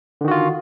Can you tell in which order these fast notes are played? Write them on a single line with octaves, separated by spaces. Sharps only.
D3 D#3 F#4 F4